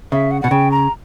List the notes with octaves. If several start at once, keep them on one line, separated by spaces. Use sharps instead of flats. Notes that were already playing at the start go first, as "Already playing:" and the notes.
C#3 E5
F#5
B2 F#5
C#3 G5
A#5